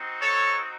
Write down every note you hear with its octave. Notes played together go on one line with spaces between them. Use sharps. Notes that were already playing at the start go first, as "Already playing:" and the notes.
Already playing: C4 D#4 F#4
A4 C#5